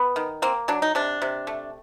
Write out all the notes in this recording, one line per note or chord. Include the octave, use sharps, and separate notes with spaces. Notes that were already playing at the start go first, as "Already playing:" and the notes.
Already playing: B3
D#3
A#3 C4
F#3 D4
D#4
C3 D4
C3
A3